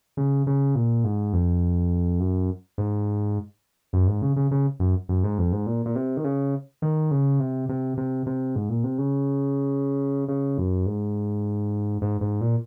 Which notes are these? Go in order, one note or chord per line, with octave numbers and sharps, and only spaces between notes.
C#3
C#3
A#2
G#2
F2
F#2
G#2
F#2
G#2
C#3
C#3
C#3
F#2
F#2
G#2
F2
G#2
A#2
A#2
C3
D#3
C#3
D#3
C#3
C3
C3
C3
C3
G#2
A#2
C3
C#3
C#3
F#2
G#2
G#2
G#2
A#2